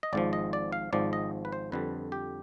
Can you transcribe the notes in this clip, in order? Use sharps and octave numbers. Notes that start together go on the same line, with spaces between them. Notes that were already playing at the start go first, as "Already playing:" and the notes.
D#5
G#1 G#2 F3 D5
D#5
D5
F5
G#1 G#2 F3 D5
D#5
B4
C5
F2 D3 G3 B4
G4